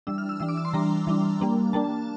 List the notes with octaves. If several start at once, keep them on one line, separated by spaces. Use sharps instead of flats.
E3 G3 D4 E6
F6
E6
E3 G3 D4 E6
D6
E6
C6
E3 G3 D4 A#5
E3 G3 D4
G3 A#3 D4
G3 A#3 D4 A5